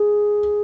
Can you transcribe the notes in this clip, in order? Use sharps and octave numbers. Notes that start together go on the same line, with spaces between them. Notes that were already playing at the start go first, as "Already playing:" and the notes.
Already playing: G#4